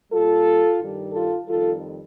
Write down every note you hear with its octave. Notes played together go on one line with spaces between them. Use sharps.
A#2 G3 F4 A4
G2 D#3 G3
F4 A4
F2 D#3 G3 F4 A4